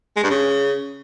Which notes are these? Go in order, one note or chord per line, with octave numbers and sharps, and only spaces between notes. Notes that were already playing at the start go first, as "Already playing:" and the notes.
G#3
G2
C#3